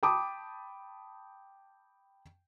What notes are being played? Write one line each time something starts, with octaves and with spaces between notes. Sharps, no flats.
G5 A5 B5 D6 D#6